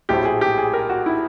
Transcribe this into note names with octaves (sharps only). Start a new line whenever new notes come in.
A#1 A2 F#3 A3 C4 G4
G#4
G4
G#4
A#4
F#4
E4